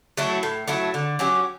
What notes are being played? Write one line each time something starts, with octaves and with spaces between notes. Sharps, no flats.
F#3 A3 E4
A2
F#3 A3 E4
D3
F#3 C#4 G4